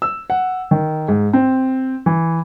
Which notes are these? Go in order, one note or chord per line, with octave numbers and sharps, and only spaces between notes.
E6
F#5
D#3
G#2
C4
E3